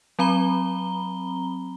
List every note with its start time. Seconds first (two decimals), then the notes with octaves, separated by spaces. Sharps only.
0.19 F#3 C4 A#5 B5 G7